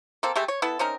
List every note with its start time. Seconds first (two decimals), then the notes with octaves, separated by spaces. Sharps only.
0.23 A#3 C4 A4
0.36 G#3 A3 G4 E5
0.48 C#5
0.62 B3 E4 A4
0.79 C4 C#4 D#4 A#4